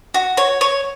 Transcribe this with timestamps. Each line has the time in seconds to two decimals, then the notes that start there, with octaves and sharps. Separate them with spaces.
0.14 F#4
0.37 C#5
0.61 C#5